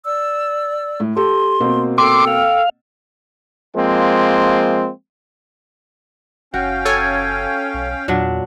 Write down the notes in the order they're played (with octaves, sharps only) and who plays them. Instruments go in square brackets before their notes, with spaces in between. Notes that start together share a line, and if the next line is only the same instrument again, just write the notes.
[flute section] D5 E6
[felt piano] A2
[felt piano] G4 A4 [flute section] C6
[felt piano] B2 A#3 C4
[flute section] A4 G5 [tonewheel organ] C6 D6
[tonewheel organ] F5
[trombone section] F3 G#3 A#3 C4
[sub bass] F#1 [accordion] C#4 F5 G5 [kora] F#4
[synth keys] A4 C#5 G#5
[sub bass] B1
[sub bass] E2 [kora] A#2 F#3 D4